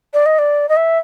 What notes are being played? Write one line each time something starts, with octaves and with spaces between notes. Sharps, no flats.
D5
D#5
D5
D#5
E5